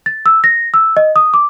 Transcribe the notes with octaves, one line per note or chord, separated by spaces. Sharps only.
A6
E6
A#6
E6
D#5
D#6
D6